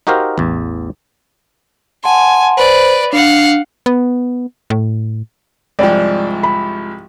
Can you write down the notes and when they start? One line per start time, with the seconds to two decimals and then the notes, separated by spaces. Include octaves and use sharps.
0.07 D#4 F#4 G4 A#4 C5 F5
0.38 A1 E2
2.04 F#5 G#5 A5 C6
2.57 B4 C5 D5
3.13 D4 F5 F#5
3.86 B3
4.70 A2
5.79 C2 G#2 F3 D5 G5
6.43 B5